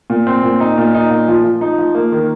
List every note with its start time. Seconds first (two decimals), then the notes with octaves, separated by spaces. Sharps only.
0.10 A#2
0.27 C4
0.43 A#2
0.60 D#4
0.78 A#2
0.94 D#4
1.10 A#2
1.28 F3
1.44 F3
1.61 D#4
1.78 F3
1.95 A#3
2.12 D#3